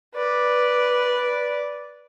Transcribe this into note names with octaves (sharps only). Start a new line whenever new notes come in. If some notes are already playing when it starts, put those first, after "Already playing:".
B4 D5